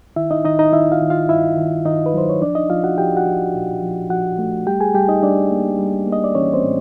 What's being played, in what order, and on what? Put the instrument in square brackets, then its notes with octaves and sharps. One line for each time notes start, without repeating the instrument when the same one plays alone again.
[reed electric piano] D#3 E4 E5
D#4 D#5
D#3 D#4 D#5
D#4 D#5
D#3 E4 E5
F4 F5
D#3
F4 F5
G2 E4 E5
D#3
D#3 D#4 D#5
B4
F#3 C5
C#5
F3 D4 D5
D#4 D#5
F3 F4 F5
F#4 F#5
F3 G4 G5
F#4 F#5
F3
A#2
F3
F3 F#4 F#5
A3
G3 G4 G5
G#4 G#5
G3 G4 G5
D#4 D#5
G3 D4 D5
A#3
G3
A#3
D#5
D5
E3 C#4 C#5
C4 C5
A2